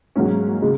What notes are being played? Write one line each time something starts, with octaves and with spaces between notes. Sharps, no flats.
G#2 F#3 A#3 C#4
C#3 G#3